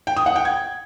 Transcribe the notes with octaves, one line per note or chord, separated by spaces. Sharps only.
G5
D#6
F#5
G5
G#6